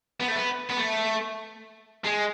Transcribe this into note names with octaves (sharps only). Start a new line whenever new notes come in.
B3
A3
B3
B3
A3
G#3